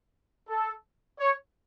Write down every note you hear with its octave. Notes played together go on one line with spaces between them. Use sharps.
A4
C#5